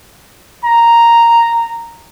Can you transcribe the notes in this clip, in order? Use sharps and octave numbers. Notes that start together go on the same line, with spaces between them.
A#5